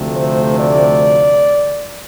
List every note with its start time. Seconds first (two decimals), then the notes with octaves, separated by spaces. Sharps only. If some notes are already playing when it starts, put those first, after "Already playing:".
Already playing: D2 C3 F3 A3
0.15 C5
0.59 D5